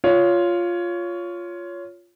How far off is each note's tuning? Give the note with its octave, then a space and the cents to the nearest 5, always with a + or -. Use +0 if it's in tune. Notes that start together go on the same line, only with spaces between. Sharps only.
F4 +0 C#5 +15